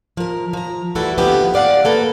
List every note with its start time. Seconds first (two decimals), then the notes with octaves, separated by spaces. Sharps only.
0.17 F3 A#4
0.53 F3 A#5
0.95 D2 E3 G3 E4 F#4 A4
1.17 D#2 D3 F3 B3 G4
1.54 D#2 D5 F5 F#5
1.85 A#3 A4 B4